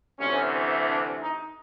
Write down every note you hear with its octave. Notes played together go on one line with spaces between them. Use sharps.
D2 C3 E3 C#4
D4
D#4